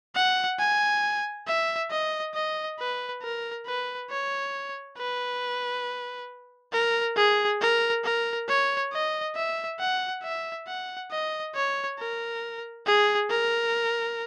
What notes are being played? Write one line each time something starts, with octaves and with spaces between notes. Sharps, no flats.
F#5
G#5
E5
D#5
D#5
B4
A#4
B4
C#5
B4
A#4
G#4
A#4
A#4
C#5
D#5
E5
F#5
E5
F#5
D#5
C#5
A#4
G#4
A#4